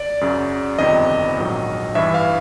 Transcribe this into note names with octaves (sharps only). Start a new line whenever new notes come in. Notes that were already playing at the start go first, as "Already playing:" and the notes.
Already playing: D5
F#2 C#3 F#3
G1 F2 C3 D#3 D#5
A#1 G#2 D#3 F#3
A1 G2 E3 E5
F5